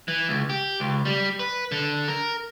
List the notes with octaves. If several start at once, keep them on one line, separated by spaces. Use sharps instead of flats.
E3
C#2
G4
C#2
G3
B4
D3
A#4